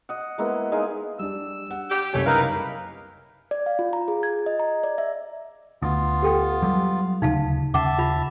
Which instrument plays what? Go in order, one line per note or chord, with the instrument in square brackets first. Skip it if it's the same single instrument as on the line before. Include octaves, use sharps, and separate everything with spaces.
[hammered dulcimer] D#5 F#5
G#3 A#3 B3 E4
G#3 D#4 F5 G#5
[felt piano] G3 D4 [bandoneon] E6
[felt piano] F#5
[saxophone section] G4
[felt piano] F#1 C2 G#5 [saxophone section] A3 G4 [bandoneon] C#5
[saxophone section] D#3 E4 F5 [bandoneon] D#4 A#4 B4
[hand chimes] D5
F5
F4
A#5
G#4
G#6
D#5
A#5
D5
E5
[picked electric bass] D2 [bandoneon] B3 F4
[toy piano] G4 A4 G5
[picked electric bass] F#3 G3
[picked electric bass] D#1 D2 C#3 [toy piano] D#4 F5 A5
[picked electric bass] D#2 C#3 [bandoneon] E5 A5 [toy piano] F#5 D6
[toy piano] F4 B5